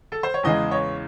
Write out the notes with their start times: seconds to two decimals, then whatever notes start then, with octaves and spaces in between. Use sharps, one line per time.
0.12 A4
0.23 C5
0.34 C#5
0.43 E2 C#3 E3 G#3 D#5
0.71 C#5